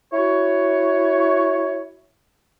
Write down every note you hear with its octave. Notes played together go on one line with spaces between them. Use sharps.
E4 F#4 C#5